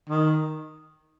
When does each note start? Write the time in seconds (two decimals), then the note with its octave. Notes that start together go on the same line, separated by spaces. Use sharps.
0.09 D#3